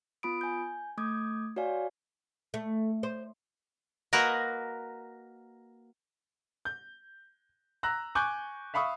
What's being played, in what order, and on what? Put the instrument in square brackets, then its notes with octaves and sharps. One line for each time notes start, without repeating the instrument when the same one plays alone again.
[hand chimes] B3 F4 B5 D#6 D7
G#5 G6
A3 D6 D#6 G6 G#6
F#4 C#5 D5 F5 G#5
[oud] A3
C5
[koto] A#3 F#4 A#4 B4 D#5 F#5
[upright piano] G6
A#5 E6 F#6 A#6
G#5 C#6 D6 F#6 G6
E5 F5 B5 C#6 D#6